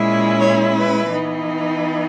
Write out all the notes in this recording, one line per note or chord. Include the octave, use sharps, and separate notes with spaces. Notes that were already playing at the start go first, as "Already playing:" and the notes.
Already playing: A#2 G#3 C#4 E4
C#5
B4
E3 B3 D#4